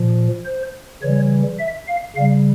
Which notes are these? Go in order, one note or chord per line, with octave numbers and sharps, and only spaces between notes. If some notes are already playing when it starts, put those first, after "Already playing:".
Already playing: A#2 F3
C5
C#3 E3 G3 C#5
E5
F5
C#3 G3 F5